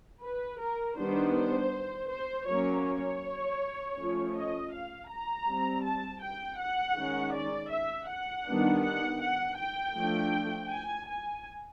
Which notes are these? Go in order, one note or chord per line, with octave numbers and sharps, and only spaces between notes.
B4
A#4
D#3 G3 B3 D4 C5
C5
C5
F#3 A#3 C#4 C#5
C#5
F3 A3 C#4
D#5
F5
A#5
G3 C4
A5
G5
F#5
D#3 G#3 C#4
D5
E5
F#5
D#3 G3 B3 D4
F#5
F#5
G5
F3 A3 D4
G#5
G#5